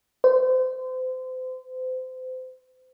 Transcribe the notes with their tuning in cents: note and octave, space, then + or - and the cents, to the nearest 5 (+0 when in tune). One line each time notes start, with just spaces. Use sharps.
C5 -30